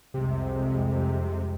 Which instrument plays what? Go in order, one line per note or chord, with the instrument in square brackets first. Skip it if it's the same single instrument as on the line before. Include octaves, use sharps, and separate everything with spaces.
[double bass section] C2 F2 G#3 [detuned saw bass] C3